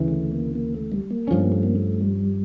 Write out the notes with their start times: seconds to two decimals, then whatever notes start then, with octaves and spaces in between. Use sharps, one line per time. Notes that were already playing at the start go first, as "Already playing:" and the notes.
Already playing: D2 C#3 E3
0.08 A3
0.32 A#3
0.55 A#3
0.74 A3
0.92 G3
1.11 A#3
1.28 G2 F3 A3 C#4
1.40 A#3
1.52 A3
1.63 A#3
1.76 A3
2.01 G3